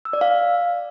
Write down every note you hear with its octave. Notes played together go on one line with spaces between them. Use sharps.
E6
D5
F5